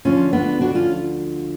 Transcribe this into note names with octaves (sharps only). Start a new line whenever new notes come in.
D2 D3 F3 C#4 F4
B3 D4
D4 F#4
C#4 F4